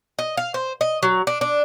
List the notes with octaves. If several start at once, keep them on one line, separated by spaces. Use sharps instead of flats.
D#5
F5
C5
D#5
F#3
D4
D4